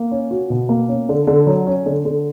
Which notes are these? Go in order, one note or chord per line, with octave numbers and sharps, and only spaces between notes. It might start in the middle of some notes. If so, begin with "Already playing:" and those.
Already playing: A#3
C#4
F#4
B2
A#3
C#4
D3
D3
F#3
C#4
D3
D3